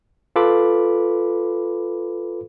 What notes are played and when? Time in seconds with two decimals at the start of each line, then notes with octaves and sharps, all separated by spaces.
0.36 F4 A4 B4 B5 D6